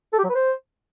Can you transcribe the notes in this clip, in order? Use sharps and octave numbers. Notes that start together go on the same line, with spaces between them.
A4
G4
F#3
B4
C5